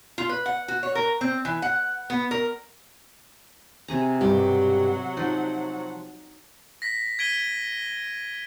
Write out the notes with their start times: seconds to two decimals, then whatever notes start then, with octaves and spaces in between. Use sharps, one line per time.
0.18 F4
0.29 B4
0.46 F#5
0.68 F#4
0.83 C#5
0.95 A#4
1.21 C4
1.45 E3
1.62 F#5
2.10 B3
2.31 A#4
3.88 C3 G#4 A#5
4.21 G2 B2 F#3 G4 F#5
5.17 F3 D#4
6.82 A#6 B6
7.19 G#6 B6 D7 D#7 G7